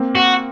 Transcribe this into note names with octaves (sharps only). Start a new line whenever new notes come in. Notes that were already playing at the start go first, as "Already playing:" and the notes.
Already playing: A#3 C4
F#4